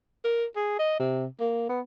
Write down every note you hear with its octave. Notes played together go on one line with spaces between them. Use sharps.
A#4
G#4
D#5
C3
A#3
B3